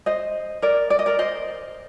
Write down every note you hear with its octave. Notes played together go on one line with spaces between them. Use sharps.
C5 D#5
A#4 D5
D5
D#5
A#4 D5
C5 D#5